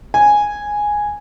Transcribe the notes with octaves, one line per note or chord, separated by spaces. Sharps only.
G#5